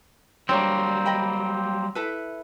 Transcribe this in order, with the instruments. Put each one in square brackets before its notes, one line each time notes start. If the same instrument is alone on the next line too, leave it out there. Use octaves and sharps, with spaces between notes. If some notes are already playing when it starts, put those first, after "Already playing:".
[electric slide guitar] F#3 G3 [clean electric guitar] A#3 C4 [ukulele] D4 C#5
[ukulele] D#5 G5 B5
E4 A4 B4